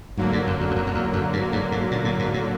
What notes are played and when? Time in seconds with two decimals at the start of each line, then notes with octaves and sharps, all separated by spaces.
0.17 G#2 D3 F#3 A#3
0.33 G2
0.47 F#2
0.61 F2
0.71 F#2
0.76 F2
0.87 F2
0.95 E2
1.13 F#2
1.33 G2
1.52 G2
1.72 G#2
1.91 A#2
2.05 A2
2.19 G#2
2.34 A2